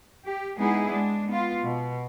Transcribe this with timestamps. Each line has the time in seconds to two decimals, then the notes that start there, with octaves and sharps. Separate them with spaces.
0.24 G4
0.57 G#3 B3 D#4 E4 G#4
0.91 G#3 D4
1.28 B3 F4
1.64 B2